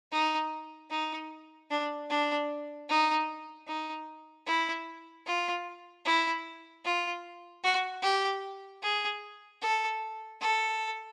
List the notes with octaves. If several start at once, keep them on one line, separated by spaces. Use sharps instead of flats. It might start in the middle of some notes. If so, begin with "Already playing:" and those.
D#4
D#4
D4
D4
D#4
D#4
E4
F4
E4
F4
F#4
G4
G#4
A4
A4